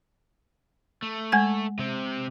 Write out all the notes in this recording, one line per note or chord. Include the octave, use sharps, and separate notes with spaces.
A3
G#3 G#5 G#6
C3 C4